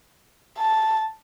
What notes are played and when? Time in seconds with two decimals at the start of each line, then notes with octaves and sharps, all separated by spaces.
0.58 A5